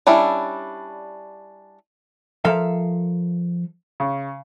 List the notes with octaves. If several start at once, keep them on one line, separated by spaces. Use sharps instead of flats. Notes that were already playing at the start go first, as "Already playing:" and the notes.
G3 C#4 D4 E4
F3 A4 A#4 E5 F5
C#3